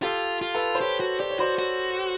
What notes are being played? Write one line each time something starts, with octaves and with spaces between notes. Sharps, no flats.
F4 G4 A4
F4
A4 B4
C5
G4 B4 C#5
F#4
G4 D5
C#5
F#4 C5 D5
F#4